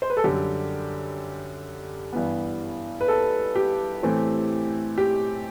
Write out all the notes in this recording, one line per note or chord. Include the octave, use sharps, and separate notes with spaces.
C5
B4
A4
F#2 D3 G3 G4
G2 E3 B3
B4
A4
G4
A2 E3 A3 C4
G4